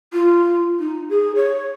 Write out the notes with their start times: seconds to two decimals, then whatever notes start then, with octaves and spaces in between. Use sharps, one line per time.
0.13 F4
0.79 D#4
1.09 G#4
1.36 C#5